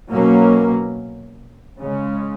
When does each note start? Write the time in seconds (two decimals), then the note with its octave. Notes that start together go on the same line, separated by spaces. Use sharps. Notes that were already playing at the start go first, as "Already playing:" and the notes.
0.12 B2 F#3 A#3 C#4
1.81 C#3 G#3 C#4